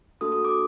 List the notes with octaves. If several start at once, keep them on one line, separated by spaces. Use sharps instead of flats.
A#3 D4 F#4 A4 D#6
D#6
D6